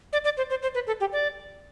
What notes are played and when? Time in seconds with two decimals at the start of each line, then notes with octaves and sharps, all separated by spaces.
0.13 D5
0.24 D5
0.37 C5
0.50 C5
0.62 C5
0.75 B4
0.87 A4
1.00 G4
1.13 D5